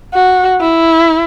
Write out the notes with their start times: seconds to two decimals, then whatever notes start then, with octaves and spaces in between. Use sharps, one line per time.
0.14 F#4
0.61 E4